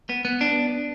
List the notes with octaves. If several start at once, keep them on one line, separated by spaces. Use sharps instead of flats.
B3
B3
D4